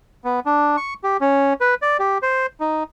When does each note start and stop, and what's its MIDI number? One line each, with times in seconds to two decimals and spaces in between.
0.24 0.40 59
0.46 0.76 62
0.77 0.94 85
1.04 1.17 67
1.21 1.53 61
1.61 1.75 71
1.82 1.97 74
1.99 2.18 67
2.23 2.46 72
2.60 2.83 63